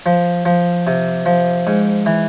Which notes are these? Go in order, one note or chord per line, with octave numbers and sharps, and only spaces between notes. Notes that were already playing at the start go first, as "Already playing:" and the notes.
F3
F3
C3
F3
G#2
E3